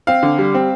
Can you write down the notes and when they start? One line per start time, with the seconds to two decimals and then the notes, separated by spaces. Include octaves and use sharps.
0.07 C4 F5
0.23 D3
0.38 G3
0.54 C4